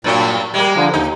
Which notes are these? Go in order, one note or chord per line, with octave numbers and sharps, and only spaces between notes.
G2 A#2 F#3 F#4
G3 G#3 A#3
D3 F3
D#2 D#4